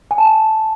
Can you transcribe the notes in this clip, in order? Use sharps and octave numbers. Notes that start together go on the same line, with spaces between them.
G#5
A5
G#5